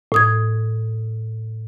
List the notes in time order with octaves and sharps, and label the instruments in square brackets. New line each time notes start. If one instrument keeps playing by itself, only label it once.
[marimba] A2 D#6 G#6